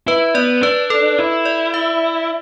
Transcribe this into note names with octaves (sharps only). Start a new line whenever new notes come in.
E4 B4
B3 D5
D4 B4
A4
E4
D5
E5